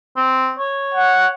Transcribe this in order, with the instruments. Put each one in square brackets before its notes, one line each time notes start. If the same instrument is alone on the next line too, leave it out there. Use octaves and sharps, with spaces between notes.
[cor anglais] C4
C#5
[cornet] F#5